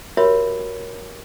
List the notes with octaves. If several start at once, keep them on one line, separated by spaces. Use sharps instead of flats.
F#4 G4 A#4 C#5 E5 B5